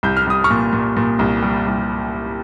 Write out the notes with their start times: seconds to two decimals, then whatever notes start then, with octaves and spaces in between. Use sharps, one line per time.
0.03 C2 G6
0.17 F6
0.27 C2 D#6
0.44 C#6 F6
0.51 A#2
0.73 A#2
0.97 A#2
1.19 C2
1.42 G3
1.67 C2